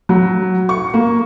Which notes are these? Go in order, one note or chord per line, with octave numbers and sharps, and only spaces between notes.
F#3
C#6
A#3